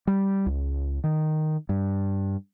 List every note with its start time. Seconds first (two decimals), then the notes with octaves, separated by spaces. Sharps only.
0.07 G3
0.46 C#2
1.04 D#3
1.69 G2